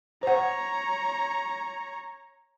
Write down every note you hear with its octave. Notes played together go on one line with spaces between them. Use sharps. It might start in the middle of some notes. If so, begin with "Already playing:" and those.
C5 C#5 F#5 A#5